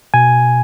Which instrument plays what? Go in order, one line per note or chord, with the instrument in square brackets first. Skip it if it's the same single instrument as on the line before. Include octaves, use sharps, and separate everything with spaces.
[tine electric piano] B2 G#5